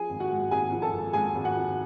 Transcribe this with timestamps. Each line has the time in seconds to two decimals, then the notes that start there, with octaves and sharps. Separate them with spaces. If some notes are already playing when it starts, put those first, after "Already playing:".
Already playing: F3 G#4 G#5
0.10 G#1
0.20 F#4 F#5
0.30 G#2
0.51 G#1 G#4 G#5
0.72 F3
0.82 A4 A5
0.93 G#1
1.13 G#2 G#4 G#5
1.34 G#1
1.44 F#4 F#5
1.55 F3